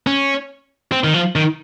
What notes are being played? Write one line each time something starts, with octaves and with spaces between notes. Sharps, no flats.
C#4
C4
D#3
F3
D#3